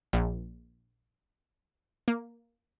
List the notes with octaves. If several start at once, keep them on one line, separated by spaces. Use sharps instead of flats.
A#1
A#3